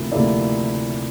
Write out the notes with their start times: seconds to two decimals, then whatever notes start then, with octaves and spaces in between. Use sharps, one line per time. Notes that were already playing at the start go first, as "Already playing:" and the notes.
Already playing: D2 C3 F3 A#3 E4
0.12 D2 C3 F3 A#3 E4 D5